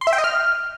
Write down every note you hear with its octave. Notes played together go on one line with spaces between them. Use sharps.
C6
E5
G5
D#5
F6